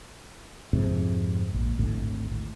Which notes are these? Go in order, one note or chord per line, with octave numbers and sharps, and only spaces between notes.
F2 G#2 C3
A#1
G#1 D2 A2